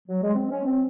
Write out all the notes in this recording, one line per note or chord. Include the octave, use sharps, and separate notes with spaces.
F#3
G#3
C4
C#4
C4